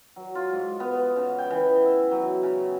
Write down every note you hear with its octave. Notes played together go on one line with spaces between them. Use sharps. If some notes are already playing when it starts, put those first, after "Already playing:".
F#3
F4
G#2
B3
C#3
G5
E3
E5
F#3
C#3